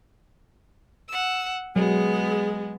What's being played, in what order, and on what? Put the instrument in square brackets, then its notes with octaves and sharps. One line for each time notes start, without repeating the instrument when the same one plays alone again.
[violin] F#5 E6
[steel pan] F#3 [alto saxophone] G#3 [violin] B3 [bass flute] G#4